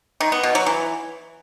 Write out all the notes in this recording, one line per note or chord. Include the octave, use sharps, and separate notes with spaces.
D#3
B3
B2
F#3
E3